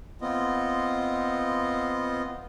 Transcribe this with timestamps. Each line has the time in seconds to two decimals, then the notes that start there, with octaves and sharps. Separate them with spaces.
0.21 B3 C4 F4 D#5